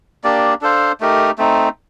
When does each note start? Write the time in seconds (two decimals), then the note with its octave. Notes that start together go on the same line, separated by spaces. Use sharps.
0.24 A#3 D4 G4 D5
0.61 D4 A4 C5 F5
1.01 A3 D#4 G4 A#4
1.38 A3 C4 D#4